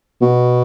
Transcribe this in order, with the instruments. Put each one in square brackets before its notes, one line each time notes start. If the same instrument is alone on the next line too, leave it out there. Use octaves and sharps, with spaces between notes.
[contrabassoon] B2